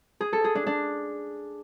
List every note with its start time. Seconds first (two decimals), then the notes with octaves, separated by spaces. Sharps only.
0.20 G#4
0.33 A4
0.44 G#4
0.55 D4
0.66 D4